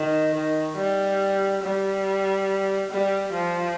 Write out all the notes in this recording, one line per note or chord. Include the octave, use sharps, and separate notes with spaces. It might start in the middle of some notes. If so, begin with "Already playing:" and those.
Already playing: D#3
D#3
G3
G3
G3
F3